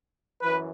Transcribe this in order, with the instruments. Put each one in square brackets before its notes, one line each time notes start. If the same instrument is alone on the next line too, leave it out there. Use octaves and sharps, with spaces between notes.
[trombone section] F#2 E3 B4